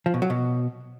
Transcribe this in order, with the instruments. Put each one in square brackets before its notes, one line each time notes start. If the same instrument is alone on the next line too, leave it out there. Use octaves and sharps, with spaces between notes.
[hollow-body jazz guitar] F3
B2
F#3
B2